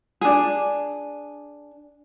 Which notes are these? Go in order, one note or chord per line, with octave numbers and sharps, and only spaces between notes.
D4 G#4